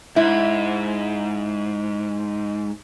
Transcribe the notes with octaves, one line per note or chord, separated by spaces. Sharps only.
G#2 E4